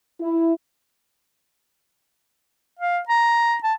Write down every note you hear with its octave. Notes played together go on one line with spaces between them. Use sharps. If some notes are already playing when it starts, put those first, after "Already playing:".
E4
F5
A#5
A5